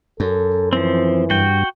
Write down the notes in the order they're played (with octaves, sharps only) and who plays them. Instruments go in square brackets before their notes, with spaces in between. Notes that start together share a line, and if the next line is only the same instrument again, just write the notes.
[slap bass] F#2 [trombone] A4
[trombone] E3 [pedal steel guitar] F3 C4
[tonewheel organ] G2 [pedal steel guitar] F#4 G5